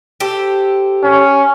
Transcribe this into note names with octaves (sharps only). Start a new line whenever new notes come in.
G4 A4 C5
C#4